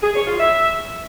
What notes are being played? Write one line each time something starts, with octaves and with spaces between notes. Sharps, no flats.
G#4
C#5
F4
E5